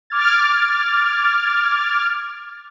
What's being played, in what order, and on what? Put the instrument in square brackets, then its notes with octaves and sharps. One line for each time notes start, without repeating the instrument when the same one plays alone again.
[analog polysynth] D6 F6 G#6 A6